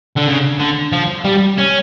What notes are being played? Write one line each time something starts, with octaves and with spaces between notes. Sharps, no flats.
D3
C#3
D3
F3
G3
C#4